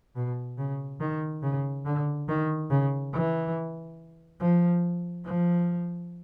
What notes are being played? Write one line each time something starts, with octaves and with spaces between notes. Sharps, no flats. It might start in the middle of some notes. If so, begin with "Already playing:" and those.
B2
C#3
D#3
C#3
D3
D#3
C#3
E3
F3
F3